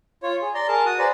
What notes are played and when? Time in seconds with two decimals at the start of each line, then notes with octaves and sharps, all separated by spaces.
0.23 F4 C#5
0.42 G#4
0.54 D5 A#5 C6
0.68 G#4 A#4 A5
0.85 F#4 D#6
0.99 G#4 B4 C5 D5 A#5